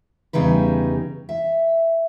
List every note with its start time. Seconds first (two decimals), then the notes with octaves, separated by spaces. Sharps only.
0.33 E2 C#3 G3 D#4 B4
1.29 E5